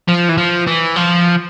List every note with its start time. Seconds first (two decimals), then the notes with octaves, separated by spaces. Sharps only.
0.08 F3
0.29 E3
0.37 F3
0.67 E3
0.96 F3